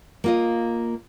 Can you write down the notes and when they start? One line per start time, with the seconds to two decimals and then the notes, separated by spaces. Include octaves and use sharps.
0.24 A#3 F4 D#5